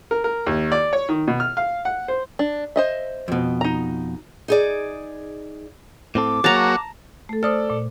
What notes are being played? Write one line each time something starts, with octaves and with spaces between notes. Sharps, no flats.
A#4
A#4
D#2
D5
C#5
D#3
B2
F6
F5
F#5
C5
D4
C5 D#5 E5
F2 B2
D#4 A#5
D#4 G#4 D5
A2 C4 A4 D6
F#3 A#3 F#4 G#4 C#5 A5 A#5
A3 A4
A4 C5 D5 D#6 F6
A#2